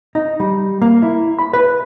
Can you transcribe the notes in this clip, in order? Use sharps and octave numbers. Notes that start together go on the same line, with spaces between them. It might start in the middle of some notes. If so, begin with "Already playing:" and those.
D#4
G3
A#3
E4
B5
B4